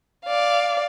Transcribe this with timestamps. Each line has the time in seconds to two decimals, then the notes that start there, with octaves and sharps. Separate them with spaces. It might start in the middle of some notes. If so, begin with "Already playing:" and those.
0.25 D5 F5